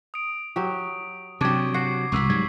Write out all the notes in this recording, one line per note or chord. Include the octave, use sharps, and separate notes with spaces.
D#6 D7
F#3 G4
C3 F#3 D4 G4 C#6 D6 G#6
F#4 F#5 C7
E1 C2 C#6 E6 B6
G#2 F#3 G3 G#6